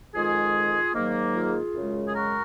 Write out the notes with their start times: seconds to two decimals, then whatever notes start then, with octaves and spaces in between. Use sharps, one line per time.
0.15 F2 D#3 G#3 F4 G#4
0.94 G#2 D#3 F#3 A#3
1.34 F4 G#4
1.74 F#2 C#3 G#3
2.08 G#4
2.15 F#4 A#4